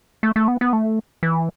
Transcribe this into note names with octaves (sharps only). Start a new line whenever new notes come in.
A3
A3
B3
B3
A3
E3